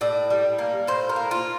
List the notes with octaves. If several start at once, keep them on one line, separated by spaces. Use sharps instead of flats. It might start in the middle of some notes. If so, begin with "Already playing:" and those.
A2 D5
G3
A#3
A2 C5
A#4
A#3
F4